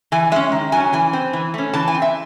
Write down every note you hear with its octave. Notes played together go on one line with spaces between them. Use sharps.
E3 G#5
G#3 C#4 E5
D#3
F#3 C#4 G#5
E3 G#5
C4
E3
A3 C#4
E3 A5
G#5
C4
E5